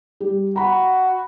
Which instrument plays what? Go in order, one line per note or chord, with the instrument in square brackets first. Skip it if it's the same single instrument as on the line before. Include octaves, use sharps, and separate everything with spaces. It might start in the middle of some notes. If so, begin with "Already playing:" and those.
[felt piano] G3
[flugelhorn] F#4 [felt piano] A#5 B5